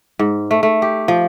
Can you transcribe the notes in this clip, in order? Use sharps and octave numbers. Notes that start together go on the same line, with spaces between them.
G#2
A3
A3
G4
F3